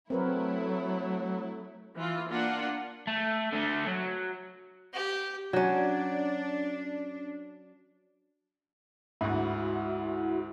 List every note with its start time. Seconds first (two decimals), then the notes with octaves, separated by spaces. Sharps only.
0.10 F#3 A3 C4 E4 A#4 B4
1.95 E3 F4
2.30 A#3 D4 F4 F#5
3.07 A3
3.52 D3 A3
3.87 F#3
4.93 G4
5.53 F#3 C#4 D4
9.21 D2 G#2 E4 F#4